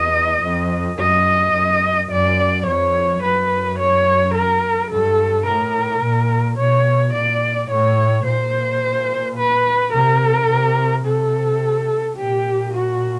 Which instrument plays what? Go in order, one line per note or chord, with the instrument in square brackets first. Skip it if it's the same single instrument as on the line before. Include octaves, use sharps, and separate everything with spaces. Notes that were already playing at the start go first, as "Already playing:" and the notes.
Already playing: [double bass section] E2 [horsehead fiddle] D#5
[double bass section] F2
[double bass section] F#2 [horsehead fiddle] D#5
[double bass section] F#2
[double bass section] F#2 [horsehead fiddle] D5
[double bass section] F2 [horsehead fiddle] C#5
[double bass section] F#2 [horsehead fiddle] B4
[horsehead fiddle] C#5
A#4
[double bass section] G2 [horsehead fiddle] A4
[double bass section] A2 [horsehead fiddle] A#4
[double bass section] A#2
[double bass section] B2 [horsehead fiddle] C#5
[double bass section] A#2 [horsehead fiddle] D5
[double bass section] A2 [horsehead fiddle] C#5
[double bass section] A#2 [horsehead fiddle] C5
[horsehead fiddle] B4
[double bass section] C3 [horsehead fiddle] A#4
[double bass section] C3
[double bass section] C3 [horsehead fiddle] A4
[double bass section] A#2 [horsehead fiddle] G4
[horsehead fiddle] F#4